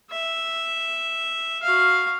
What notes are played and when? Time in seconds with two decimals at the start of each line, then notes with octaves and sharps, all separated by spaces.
0.10 E5
1.63 F#4 F5